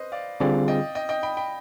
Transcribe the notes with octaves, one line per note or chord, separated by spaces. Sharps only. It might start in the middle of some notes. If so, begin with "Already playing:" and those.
Already playing: B4 C5 D#5
D5 F5
D3 G3 C4 F4 G#4 D5 F5
D#5 G5
D#5 G5
D#5 G5
G5 B5
G5 B5